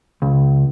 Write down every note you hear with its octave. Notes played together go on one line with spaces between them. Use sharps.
C#2